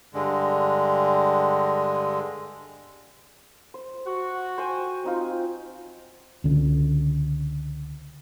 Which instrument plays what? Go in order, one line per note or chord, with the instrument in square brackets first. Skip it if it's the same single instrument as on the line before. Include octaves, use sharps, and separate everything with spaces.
[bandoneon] G2 D3 G#3
[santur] C5
[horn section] F#4
[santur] C5 G5 G#5
C4 D#4 F4
[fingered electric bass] C#2 D3